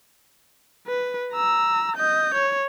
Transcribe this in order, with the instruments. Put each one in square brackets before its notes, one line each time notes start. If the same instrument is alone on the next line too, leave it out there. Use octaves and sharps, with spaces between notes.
[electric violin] B4
A#5 E6
D#5 G6
C#5